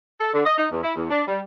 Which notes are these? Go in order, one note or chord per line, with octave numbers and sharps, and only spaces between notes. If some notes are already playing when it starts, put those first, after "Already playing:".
A4
D3
D#5
D#4
E2
E4
E2
D4
G3